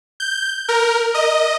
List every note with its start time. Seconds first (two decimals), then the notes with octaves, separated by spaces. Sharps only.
0.20 G6
0.69 A#4
1.14 D#5